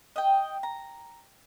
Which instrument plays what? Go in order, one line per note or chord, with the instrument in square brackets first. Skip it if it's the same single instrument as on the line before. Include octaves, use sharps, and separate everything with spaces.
[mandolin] D#5 G5
A#5